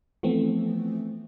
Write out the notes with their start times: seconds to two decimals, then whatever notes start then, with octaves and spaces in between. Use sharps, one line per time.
0.23 E3 F3 A3 B3 C4